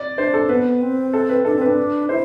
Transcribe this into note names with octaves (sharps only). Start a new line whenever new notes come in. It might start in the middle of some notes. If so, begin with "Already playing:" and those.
Already playing: D5
D4 C5
A4
B3 B4
C4
A4
B4
D4 A4
C4
D4 B4
E4 C5